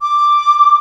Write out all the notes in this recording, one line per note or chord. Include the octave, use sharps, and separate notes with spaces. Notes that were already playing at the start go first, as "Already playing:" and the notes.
D6